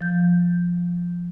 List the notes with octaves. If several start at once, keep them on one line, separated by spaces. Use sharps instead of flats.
F3 G6